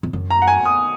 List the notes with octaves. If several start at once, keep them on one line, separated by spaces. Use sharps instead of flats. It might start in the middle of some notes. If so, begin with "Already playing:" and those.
F2
F#2
A#5
F#5
G#5
D#6